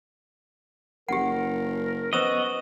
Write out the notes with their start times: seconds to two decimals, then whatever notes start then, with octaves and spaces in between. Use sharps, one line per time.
1.09 F#1 G4 A#4 F#5
2.13 B3 F#4 B4 C5 D#5 E6